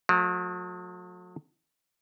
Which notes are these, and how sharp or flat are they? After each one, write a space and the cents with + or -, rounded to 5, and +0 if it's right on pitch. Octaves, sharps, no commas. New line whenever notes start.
F#3 -45 A3 +0